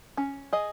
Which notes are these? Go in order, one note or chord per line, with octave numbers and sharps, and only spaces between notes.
C#4
G#4 D#5